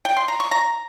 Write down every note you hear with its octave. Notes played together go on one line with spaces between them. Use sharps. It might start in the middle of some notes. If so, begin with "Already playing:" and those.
G5
C6
A#5
C#6
A#5